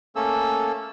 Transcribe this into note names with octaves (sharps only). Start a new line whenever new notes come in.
A3 A#3 C#4 A4 E6